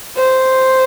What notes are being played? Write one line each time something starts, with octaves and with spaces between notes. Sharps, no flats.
C5